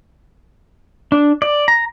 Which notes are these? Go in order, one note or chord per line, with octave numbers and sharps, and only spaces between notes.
D4
D5
A#5